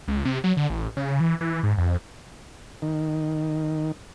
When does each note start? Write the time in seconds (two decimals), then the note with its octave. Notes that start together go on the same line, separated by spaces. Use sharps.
0.08 C#2
0.25 C3
0.44 F#3
0.57 D3
0.70 A1
0.97 C#3
1.20 E3
1.41 E3
1.63 G#2
1.78 F2
2.82 D#3